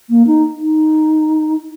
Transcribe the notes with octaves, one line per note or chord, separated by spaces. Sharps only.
A#3
D#4
D#4